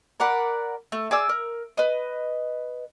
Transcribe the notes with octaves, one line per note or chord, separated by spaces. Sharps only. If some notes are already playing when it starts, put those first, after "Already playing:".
A#4 D5 F#5 B5
A3
G#4 D5 D6 E6
A#4
B4 D#5